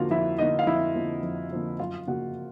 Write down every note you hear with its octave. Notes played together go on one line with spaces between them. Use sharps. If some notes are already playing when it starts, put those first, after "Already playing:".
Already playing: F2 D3 F3 A#3 F4 F#4 F5
F2 E4 E5
D3 F3 A#3 D#4 D#5
F5
F2 E4 E5
D3 F3 A#3
F2
D3 F3 A#3
F#2 F4 F5
C#3 F3 A#3 F#4 F#5